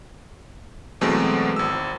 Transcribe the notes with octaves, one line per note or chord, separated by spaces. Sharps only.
E2 B2 F#3 G#3 A3 C4
G#1 E6